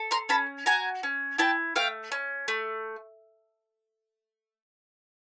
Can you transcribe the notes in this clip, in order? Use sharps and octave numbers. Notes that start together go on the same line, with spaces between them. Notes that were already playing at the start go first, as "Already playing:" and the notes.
Already playing: A4
A#5 C6
C#4 A5 B5
F#4 G#5 A#5
C#4
E4 G5 A5
A3 F5 G5
C#4
A3